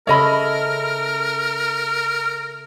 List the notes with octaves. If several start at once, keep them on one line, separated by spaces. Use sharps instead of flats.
C#3 A4 A#4 C#5 D#5 E5 B5